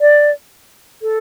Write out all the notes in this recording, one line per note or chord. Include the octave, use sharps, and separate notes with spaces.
D5
A4